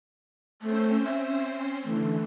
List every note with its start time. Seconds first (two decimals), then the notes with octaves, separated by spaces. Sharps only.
0.62 A3 C4 C#4 C5
1.05 E5
1.84 D3 E3 A3